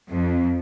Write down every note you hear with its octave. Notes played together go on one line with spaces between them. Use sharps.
F2